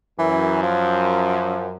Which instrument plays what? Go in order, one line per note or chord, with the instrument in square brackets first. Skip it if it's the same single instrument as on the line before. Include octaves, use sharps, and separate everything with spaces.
[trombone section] F#2 [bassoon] E3
[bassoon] F3